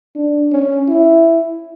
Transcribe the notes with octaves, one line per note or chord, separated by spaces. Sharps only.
D4
C#4
E4